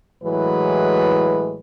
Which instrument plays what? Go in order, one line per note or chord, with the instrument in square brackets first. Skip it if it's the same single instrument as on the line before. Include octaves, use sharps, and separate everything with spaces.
[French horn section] A2 E3 F#3 G#3 B4